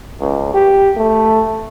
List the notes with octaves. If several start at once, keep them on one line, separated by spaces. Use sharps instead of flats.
C#2
G4
A3